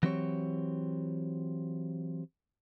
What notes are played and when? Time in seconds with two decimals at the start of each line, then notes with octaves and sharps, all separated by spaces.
0.03 E3 F#3 C4 G4 C#5